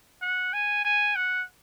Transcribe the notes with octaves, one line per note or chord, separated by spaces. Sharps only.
F#5
G#5
G#5
F#5